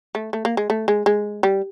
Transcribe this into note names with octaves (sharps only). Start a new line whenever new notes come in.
A3
A3
A#3
G#3
A3
G#3
G#3
G3